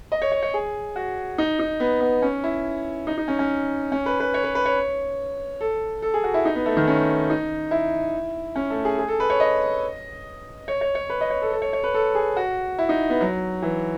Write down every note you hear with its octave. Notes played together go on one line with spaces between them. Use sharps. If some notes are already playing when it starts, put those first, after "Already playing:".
D#5
C#5
C#5
C#5
G#4
F#4
D#4
D#4
B3
B3
C#4
E4
D#4
D#4
C#4
C#4
C#4
B4
B4
C#5
B4
B4
C#5
A4
A4
G#4
F#4
E4
D#4
B3
A3
D#3
C#4
D#4
E4
C#4
A3
G#4
G#4
A4
B4
C#5
D#5
C#5
C#5
C#5
B4
D#5
C#5
A4
A4
C#5
C#5
B4
A4
G#4
F#4
E4
D#4
B3
F#3
E3